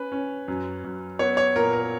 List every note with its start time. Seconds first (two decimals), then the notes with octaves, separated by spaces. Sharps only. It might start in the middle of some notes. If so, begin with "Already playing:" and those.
Already playing: C#4 B4
0.12 C#4
0.48 F#2
0.84 F#2
1.19 B3 C#5
1.37 C#5
1.56 A#2 A#4
1.73 A#4